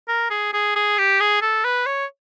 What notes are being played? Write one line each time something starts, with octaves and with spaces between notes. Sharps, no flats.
A#4
G#4
G#4
G#4
G4
G#4
A4
B4
C#5